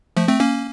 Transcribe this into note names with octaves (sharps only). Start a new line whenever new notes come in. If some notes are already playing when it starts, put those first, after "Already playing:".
F3 A3
A3 C4
A#3 C#4